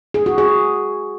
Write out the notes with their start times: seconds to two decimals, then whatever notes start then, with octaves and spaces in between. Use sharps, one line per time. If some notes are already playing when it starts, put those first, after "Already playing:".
0.14 G#4
0.26 F#4
0.38 G#4